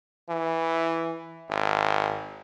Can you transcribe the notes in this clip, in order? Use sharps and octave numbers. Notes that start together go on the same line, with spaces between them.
E3
G#1